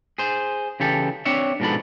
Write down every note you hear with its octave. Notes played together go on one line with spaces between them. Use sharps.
G#4 C5
C#3 E3 G4 A4
C4 D4 C#5 E5
G#2 B2 F3 D4 A4 B5